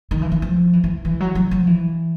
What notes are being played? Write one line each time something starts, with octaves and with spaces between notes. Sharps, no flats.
D#3
E3
E3
F3
E3
E3
E3
F#3
F#3
F3
E3